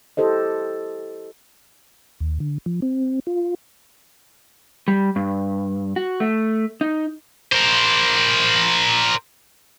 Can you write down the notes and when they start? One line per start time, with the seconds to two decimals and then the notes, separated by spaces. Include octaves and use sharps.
0.17 E4 G4 A4 C5 D#5
2.20 D#2
2.40 D3
2.66 F3
2.82 C4
3.27 F4
4.88 G3
5.16 G2
5.96 F#4
6.20 A3
6.81 D#4
7.52 A#4 C5